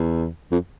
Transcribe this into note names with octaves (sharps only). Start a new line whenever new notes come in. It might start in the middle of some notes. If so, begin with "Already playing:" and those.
Already playing: E2
F2